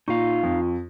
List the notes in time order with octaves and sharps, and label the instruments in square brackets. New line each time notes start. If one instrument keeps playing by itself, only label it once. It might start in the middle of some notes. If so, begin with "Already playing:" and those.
[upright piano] A#2 [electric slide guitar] D#4 F5 [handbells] F4 C#6
[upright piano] F2